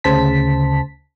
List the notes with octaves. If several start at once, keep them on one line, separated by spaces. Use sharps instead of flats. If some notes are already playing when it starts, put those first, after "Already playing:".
D2 C#3 C5 A5 B6